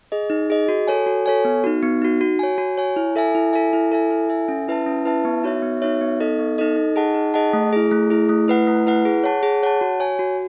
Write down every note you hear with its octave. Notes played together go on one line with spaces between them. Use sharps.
G#4 D#5
D#4
G#4 D#5
F#4
A4 C#5 G#5
F#4
A4 C#5 G#5
B3
D#4 F#4
B3
D#4 F#4
F#4
C#5 G#5
F#4
C#5 G#5
E4
A4 E5 G#5
E4
A4 E5 G#5
E4
A4 E5 G#5
E4
A4 E5 G#5
C#4
E4 B4 E5 A5
C#4
E4 B4 E5 A5
B3
D#4 F#4 C#5 E5
B3
D#4 F#4 C#5 E5
B3
D#4 A4 D#5
B3
D#4 A4 D#5
D#4
G#4 D#5 F#5 A5
D#4
G#4 D#5 F#5 A5
A3
E4 G#4
A3
E4 G#4
A3
E4 B4 F#5
A3
E4 B4 F#5
G#4
C#5 F#5 A5
G#4
C#5 F#5 A5
F#4
C#5 G#5
F#4